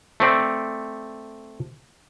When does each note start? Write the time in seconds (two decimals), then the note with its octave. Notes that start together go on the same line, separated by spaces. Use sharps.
0.20 A3 C4 D5